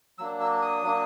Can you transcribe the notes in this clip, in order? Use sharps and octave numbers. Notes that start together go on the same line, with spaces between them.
F#3 A#3 D4 E6
E6
D#6
F#3 A#3 D4